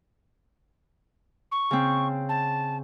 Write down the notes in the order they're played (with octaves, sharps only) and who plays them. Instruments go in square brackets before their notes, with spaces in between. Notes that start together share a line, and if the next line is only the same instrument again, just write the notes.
[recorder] C#6
[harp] C#3 C4
[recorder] A5